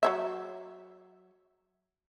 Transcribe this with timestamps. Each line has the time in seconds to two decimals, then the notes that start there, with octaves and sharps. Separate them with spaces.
0.03 F#3 C#5 E5